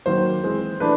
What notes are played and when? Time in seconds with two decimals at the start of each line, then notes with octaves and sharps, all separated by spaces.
0.06 D#3 F#3 A#3 C5
0.44 E3 G#3 C4
0.80 E3 A3 D4 B4